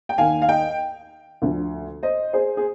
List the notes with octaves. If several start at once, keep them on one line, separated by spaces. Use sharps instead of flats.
G5
D#2 D#3 F5 G#5
F5
D#5 G5
D2 D3 F3
C5 D#5
G#4 C5
G#4